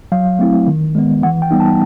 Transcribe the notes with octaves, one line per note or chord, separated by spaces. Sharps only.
F#3 F5
A3 C4 E4
D#3
G#3 B3
E3 F#5
G5
G3 B3 D#4
A5